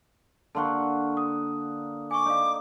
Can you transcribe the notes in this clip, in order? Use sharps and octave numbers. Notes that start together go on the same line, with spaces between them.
D3 A#3 F#5 A5 C6 C#6
D#6
G#5 C#6 D6
D#4 D5 F5